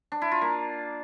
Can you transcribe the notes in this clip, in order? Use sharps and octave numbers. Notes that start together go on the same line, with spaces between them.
D4
E4
F4
A#3